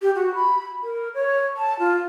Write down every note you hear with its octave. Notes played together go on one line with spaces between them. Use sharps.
G4
F#4
B5
A#4
C#5
A5
F4